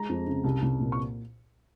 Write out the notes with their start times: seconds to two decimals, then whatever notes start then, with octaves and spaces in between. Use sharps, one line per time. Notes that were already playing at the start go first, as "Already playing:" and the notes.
Already playing: G#3 A#5
0.09 F2
0.27 C#3
0.44 C2
0.62 C2
0.80 A#2
0.92 C#6